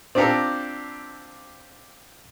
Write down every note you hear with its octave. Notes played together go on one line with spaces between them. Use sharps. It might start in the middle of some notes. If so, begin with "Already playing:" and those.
C4 D4 F4 G4 A4 A#5